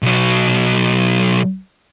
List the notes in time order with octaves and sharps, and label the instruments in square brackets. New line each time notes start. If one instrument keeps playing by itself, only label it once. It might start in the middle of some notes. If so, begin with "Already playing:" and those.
[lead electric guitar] B1 F#3